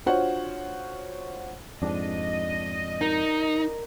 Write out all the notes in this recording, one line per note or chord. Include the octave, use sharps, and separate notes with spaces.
D4 F4 F#4 C5 C#5 F#5
F2 G#2 D4 D#5 A5
D#4 A#4